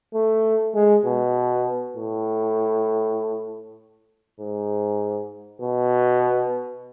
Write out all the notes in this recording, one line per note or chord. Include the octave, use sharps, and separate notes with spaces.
A3
G#3
B2
A2
G#2
B2